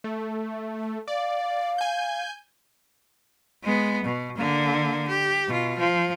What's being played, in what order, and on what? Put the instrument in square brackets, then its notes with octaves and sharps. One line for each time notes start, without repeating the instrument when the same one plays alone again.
[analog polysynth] A3
[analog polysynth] D5 [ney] F5
[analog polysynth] G#5 G6
[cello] G#3 B3
B2
D3 A#3
G4
B2 F4
F3